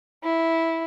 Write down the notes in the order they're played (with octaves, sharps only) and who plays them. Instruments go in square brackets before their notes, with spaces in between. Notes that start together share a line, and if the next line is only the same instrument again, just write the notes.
[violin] E4